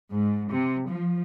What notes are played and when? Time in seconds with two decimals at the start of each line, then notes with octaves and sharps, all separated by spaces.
0.12 G#2
0.51 C3
0.89 F3